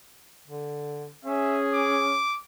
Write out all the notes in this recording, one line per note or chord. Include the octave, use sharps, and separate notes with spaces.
D3
C#4 G#4 E5
D6